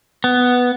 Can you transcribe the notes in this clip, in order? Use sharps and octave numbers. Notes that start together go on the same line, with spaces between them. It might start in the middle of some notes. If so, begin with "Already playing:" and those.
B3